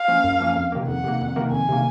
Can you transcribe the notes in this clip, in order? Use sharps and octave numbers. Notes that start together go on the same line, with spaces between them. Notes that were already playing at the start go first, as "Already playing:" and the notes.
Already playing: F5
F3 A#3 C#4
F#2
F3 A#3 C#4
F2
C3 D#3 A#3
F2 F#5
C3 D#3 A#3
F2
C3 D#3 A#3
F2 G#5
C3 D#3 A#3